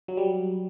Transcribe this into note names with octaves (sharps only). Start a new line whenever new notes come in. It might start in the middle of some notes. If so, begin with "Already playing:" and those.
F#3
G3